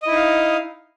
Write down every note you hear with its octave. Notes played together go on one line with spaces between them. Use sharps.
D#4 E4 D#5 F5